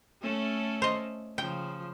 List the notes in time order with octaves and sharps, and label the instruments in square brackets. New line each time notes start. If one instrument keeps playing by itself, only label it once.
[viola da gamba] A3 C#4 A4
[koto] C5 D#5
[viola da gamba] C#3 F3 [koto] G5